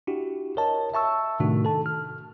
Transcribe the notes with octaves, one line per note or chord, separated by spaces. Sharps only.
D4 E4 F#4 G4
A#4 C#5 D#5 A5
E5 A5 C#6 E6
A2 C3 D#3 A3 D4 F#4
A4 A5
F6